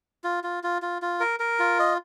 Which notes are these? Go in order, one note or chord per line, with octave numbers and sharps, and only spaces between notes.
F4
F4
F4
F4
F4
A#4
A#4
F4
D#5